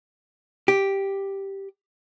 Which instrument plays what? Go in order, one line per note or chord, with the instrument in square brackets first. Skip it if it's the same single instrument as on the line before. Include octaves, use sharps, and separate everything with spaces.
[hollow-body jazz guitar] G4